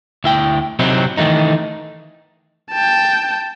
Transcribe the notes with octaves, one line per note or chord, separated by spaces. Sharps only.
D2 E4 G5
C3 F#3 C4 D#4 E4
D#3 E3 A3 D#4
G5 A5